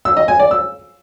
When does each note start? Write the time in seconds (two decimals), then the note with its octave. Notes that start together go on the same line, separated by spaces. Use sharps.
0.05 E6
0.17 D#5
0.28 G#5
0.40 D5
0.51 E6